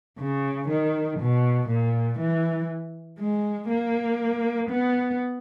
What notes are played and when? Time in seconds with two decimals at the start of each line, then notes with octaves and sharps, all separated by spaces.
0.18 C#3
0.68 D#3
1.19 B2
1.68 A#2
2.19 E3
3.19 G#3
3.69 A#3
4.69 B3